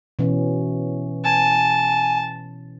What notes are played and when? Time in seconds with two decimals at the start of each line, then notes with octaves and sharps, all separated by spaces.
0.19 B2 E3 C#4
1.24 G#5 A5